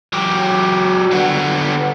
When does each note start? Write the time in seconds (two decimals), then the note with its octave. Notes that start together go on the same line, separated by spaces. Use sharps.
0.13 F#3 G4
1.11 D3 B3